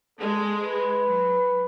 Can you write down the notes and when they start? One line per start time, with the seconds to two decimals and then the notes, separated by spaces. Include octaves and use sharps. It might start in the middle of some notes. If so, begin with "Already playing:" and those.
0.19 G#3 A4
0.62 B4
1.07 F#3